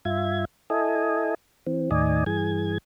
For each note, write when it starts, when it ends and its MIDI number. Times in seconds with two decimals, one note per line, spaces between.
0.05 0.45 43
0.05 0.45 65
0.05 0.45 76
0.05 0.45 92
0.70 1.34 64
0.70 1.34 69
0.70 1.34 75
0.70 1.34 80
1.67 1.90 52
1.67 1.90 60
1.91 2.24 39
1.91 2.24 45
1.91 2.24 51
1.91 2.24 74
1.91 2.24 75
1.91 2.24 80
2.26 2.78 43
2.26 2.78 52
2.26 2.78 68
2.26 2.78 92